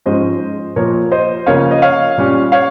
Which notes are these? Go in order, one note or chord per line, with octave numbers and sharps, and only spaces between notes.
G#2 F3 G#3 C#4 C5 D#5
A#2 F3 A#3 A#4 C#5
C5 D#5
C#3 F3 A#3 C#4 C#5 F5
D#5
C#5 F5
A#2 G3 C#4
C#5 F5